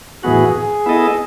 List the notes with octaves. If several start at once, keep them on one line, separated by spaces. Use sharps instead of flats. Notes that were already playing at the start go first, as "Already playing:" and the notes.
A2 E3 B3 F#4 G#4
G#4
B3 E4 A4 D#5